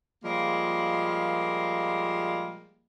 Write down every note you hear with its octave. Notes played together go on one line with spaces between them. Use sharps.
A#2 F3 G3 G#3 A#3